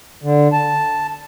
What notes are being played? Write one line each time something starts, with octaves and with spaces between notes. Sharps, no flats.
D3
A5